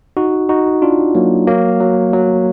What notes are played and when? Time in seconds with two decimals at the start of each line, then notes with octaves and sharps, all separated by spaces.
0.17 D#4 F#4
0.49 D#4 F#4
0.82 D4 F4
1.15 F#3 A#3
1.47 F#3 A#3
1.81 F#3
2.13 F#3